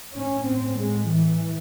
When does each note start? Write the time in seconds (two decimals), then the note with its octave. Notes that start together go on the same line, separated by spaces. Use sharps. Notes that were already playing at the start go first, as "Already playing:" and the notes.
0.15 A2 C#4
0.45 C4
0.77 G#3
1.09 E3